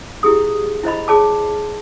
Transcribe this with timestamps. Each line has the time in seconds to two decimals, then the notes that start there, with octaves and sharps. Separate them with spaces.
0.23 E4 G4 G#4 D#6
0.83 E4 C5 D#5 B5
1.08 G#4 C#5 A5 D6